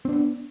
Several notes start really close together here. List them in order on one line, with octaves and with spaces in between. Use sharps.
C4 D4 B3